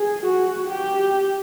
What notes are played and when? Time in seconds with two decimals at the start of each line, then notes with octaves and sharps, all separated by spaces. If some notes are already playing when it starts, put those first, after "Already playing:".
Already playing: G#4
0.26 F#4
0.69 G4